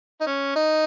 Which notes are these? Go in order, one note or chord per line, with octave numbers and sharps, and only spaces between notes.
D#4
C#4
D#4